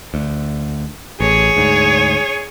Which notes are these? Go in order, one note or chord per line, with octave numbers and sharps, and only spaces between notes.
D2
A1 G#4 C#5
D2 G#2